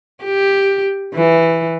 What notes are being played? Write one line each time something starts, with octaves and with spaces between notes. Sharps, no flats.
G4
E3